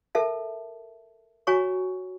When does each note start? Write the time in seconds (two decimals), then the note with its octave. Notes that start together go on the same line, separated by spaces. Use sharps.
0.15 A4 A#4 E5 A5
1.47 F#4 C#5 G#5 A#5 C#6